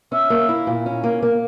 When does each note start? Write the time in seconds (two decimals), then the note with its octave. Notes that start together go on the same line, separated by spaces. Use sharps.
0.12 C#4 E5
0.30 A#3
0.49 E4
0.67 A#2
0.86 C#4
1.04 A#3
1.23 A#3